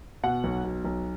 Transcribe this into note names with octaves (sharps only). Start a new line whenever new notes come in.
B2 F#5
B1
B2
B1